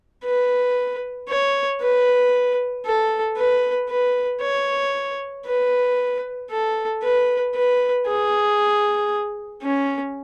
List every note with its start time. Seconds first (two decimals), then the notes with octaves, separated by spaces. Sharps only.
0.24 B4
1.29 C#5
1.81 B4
2.85 A4
3.37 B4
3.90 B4
4.41 C#5
5.46 B4
6.51 A4
7.03 B4
7.55 B4
8.07 G#4
9.63 C#4